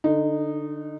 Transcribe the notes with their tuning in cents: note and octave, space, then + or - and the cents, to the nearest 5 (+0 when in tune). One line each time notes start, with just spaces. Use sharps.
D3 +10 D#4 -15